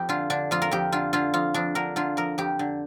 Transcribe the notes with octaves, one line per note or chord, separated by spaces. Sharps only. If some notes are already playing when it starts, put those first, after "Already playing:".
Already playing: F2 G4
D3 F4
D3 D4
F2 F4
A#4
F2 G4
D3 F4
D3 F4
F2 F4
F2 D4
D3 A#4
D3 F4
F2 A#4
F2 G4
D3